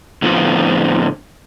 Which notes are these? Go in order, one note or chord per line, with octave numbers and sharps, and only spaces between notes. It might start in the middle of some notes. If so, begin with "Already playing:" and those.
A2 D3 F3 B3 C4 F4